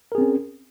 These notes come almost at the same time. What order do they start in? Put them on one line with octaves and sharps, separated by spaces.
A#4 G#4 C4 C#4